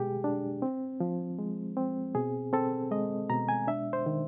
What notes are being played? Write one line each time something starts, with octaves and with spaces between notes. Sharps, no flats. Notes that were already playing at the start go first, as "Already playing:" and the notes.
Already playing: B2 G#3 B3 G4 G#4
D4
C4
F3
G#3
C4
B2 G#4
C4 A4
G#3 D#5
B2 A#5
G#5
D4 E5
C5
D#3